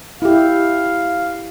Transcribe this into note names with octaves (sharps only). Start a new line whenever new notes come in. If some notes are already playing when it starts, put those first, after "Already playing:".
E4 G4 F5